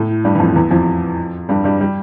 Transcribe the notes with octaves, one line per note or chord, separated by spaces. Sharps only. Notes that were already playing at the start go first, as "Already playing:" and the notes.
Already playing: A2 A3
G2 G3
E3
F2 F3
E2 E3
F2 F3
G2 G3
G2 G3
G3